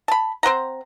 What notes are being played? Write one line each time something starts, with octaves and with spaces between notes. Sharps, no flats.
A5 B5
C4 C5 F#5 A#5